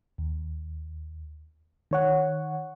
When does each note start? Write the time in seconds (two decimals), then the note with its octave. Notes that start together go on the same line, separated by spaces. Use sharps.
0.18 D#2
1.91 D#3 C#5 F#5